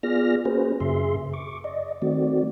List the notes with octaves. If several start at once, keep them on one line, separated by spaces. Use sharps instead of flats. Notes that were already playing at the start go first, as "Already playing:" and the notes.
B3 F4 G#4 D5 F6 A#6
A#3 C#4 F#4 G#4 B4 C5
F#2 C#3 G#4 E5 C6
C#6 D6
D5 D#5
D#3 A3 C4 F#4 D5